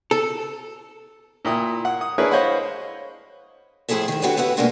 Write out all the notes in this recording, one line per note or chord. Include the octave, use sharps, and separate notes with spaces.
A4
A#2 E4 G5 D#6
F#5
D#6
D4 E4 G#4 A#4 B4 C#5
C5 C#5 D#5 F5 F#5 B5
A2 F3 E4 G#4 A4 E5
G#2 D#3
D4 F#4 G4 A4 B4 C#5
B3 E4 B4 F#5
G2 B2 G#3 A#3 D4